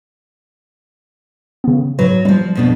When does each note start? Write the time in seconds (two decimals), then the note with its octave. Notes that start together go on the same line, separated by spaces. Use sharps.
1.64 C#3 B3
1.99 G#2 F#3 B4
2.25 E3 F3 G3
2.55 F2 B2 D4